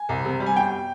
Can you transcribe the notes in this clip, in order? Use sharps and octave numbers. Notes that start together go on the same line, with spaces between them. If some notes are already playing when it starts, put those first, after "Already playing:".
Already playing: G#5
C2
C3
G3
G#5
G1 G5